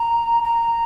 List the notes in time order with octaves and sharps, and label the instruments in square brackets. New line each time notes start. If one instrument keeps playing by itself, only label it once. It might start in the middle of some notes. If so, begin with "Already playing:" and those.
Already playing: [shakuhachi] A#5
A#5